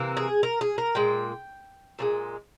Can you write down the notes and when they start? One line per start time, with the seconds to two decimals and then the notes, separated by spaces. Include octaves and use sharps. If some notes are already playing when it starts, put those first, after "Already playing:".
Already playing: C3 E3 A#3
0.17 G#4
0.43 A#4
0.61 G#4
0.78 A#4
0.95 A#2 G#3 G5
1.99 A#2 F3 G#3